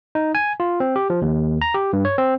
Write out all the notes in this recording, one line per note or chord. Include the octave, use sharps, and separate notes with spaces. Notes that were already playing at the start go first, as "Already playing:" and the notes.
D#4
G#5
F4
C4
G4
F3
D#2
A#5
G4
G2
C#5
C4